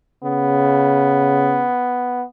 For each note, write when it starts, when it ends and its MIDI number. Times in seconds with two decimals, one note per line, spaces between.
0.24 1.68 49
0.24 2.24 59